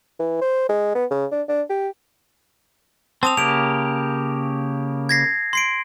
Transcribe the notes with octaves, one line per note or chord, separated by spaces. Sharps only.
E3
C5
G#3
B3
C#3
D4
D4
G4
C4 A5 D#6 F7
C#3 A#3 G4 D7 F7
G#6 A#6 C7
C6 C7 D7